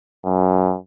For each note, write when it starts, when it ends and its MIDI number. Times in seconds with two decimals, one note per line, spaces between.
0.25 0.75 42